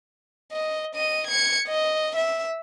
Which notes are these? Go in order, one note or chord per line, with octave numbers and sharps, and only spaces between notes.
D#5
D#5 D#7
G#6 C#7
D#5
E5